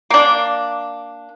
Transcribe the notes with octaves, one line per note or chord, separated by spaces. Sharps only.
A#3 D4